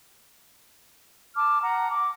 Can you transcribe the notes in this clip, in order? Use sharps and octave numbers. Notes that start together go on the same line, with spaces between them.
A5 D6 F6
F#5 A#5
D6